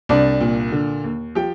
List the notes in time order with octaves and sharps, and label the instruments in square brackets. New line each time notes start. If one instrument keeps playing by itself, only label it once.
[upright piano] C2 D4 D5
A#2
D3
D#2
F3 G4 G5